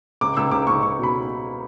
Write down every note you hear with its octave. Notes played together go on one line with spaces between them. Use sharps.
C#2 D6
C#2 E6
C#2 D6
C#2 C#6
C#2 C#6
B2 B5